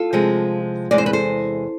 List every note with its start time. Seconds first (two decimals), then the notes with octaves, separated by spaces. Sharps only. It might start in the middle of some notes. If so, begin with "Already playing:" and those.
Already playing: F4 A4
0.13 C3 F3 G#3
0.91 E2 C3 G#3 D5
0.98 C5
1.06 B4
1.13 A4 C5